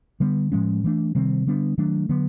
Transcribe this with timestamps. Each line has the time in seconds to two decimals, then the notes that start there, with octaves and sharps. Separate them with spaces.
0.20 D3 G3 B3
0.52 A2 F3 G#3 C#4
0.84 E3 A3 D4
1.15 C3 D#3 G3 C4
1.47 D3 G3 B3 D4
1.78 D#3 F#3 A3 D4
2.09 D3 F#3 B3